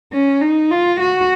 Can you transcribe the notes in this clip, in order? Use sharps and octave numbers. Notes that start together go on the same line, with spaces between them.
C#4
D#4
F4
F#4